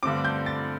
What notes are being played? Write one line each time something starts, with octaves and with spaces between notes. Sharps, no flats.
G2 D3 A3 C4 D6
G6
A6